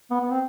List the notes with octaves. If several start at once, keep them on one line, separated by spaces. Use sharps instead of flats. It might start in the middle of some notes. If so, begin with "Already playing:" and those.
B3
B3
C4